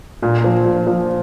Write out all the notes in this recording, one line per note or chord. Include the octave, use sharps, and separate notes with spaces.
A#2
F3
A#2
F3